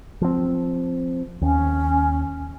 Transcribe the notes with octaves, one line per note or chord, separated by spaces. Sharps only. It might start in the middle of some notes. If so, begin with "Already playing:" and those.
F3 C4
D#2 C#4